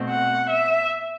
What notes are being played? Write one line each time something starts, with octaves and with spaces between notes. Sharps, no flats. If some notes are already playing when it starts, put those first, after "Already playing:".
Already playing: B2 A3 C4
F#5
E5